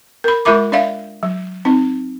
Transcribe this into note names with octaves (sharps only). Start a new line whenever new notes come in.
A#4 B5
G#3 F4 A#4 E5 B5 D6
D4 D5 E5 F5
F#3
C4 D#4